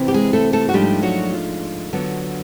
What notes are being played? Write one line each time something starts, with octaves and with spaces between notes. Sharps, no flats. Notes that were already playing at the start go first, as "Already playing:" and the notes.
Already playing: C3 E3 C4
G4
G#3 G#4
A3 A4
A3 A4
F#4
G#2 F3 G3 A3 D4 G4
F#3 F#4
F4
D3 F#3 B3